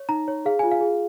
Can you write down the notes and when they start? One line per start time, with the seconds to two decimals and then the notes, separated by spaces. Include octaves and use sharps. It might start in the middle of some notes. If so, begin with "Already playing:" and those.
Already playing: C#5
0.09 D#4 A#5
0.28 C#5
0.45 G#4 F5
0.59 F4 G#5
0.72 F5
0.81 G#4